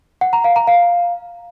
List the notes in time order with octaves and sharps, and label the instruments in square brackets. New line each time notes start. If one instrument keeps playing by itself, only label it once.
[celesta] F#5
A#5
F5
A#5
F5